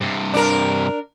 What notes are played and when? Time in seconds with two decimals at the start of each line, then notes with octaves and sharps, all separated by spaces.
0.01 G2 C3
0.34 D4 A#4